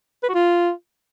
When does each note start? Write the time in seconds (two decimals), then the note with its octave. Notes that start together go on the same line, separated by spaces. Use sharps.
0.23 B4
0.29 F#4
0.34 F4